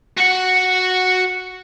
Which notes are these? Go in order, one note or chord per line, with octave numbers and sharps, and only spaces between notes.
F#4 F#5